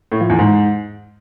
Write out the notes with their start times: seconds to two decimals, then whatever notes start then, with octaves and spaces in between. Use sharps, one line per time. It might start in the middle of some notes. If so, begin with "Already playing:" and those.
0.12 A2
0.21 F3
0.30 E2
0.39 G#2